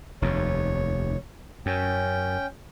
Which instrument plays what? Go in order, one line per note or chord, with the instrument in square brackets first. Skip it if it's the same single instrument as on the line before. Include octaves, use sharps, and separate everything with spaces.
[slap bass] F1 D#2 [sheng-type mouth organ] C#5
[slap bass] F#2 [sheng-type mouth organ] C#4 G5